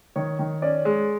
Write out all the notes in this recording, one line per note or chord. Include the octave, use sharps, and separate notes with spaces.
D#3 C#5
D#3
C#4 D5
G#3